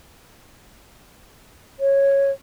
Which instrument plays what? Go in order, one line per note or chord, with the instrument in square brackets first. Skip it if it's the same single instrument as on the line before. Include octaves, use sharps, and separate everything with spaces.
[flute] C#5